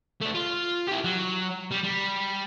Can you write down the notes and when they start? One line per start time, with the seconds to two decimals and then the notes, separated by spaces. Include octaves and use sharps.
0.21 A3 D4
0.34 F4
0.87 E4 G4
1.04 F#3
1.72 G3
1.84 G3